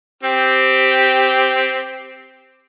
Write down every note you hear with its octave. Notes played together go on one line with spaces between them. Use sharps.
C4 G4